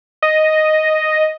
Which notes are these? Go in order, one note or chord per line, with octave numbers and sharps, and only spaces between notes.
D#5